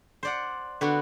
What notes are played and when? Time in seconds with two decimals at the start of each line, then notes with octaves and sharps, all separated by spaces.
0.23 C5 D5 F#5
0.81 D3 B3 F#4